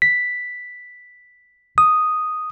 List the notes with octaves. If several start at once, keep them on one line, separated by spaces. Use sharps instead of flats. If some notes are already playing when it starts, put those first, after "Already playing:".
B6
D#6